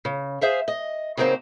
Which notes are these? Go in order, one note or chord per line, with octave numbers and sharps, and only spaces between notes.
C#3
G#4 C5 E5 F5
D#5
C#3 F#3 A#3 C4 D#4 C5